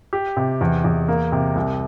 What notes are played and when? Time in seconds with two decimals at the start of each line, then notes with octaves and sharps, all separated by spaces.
0.13 G4
0.37 C3
0.61 E2
0.84 E2
1.08 A#3
1.32 C3
1.56 C2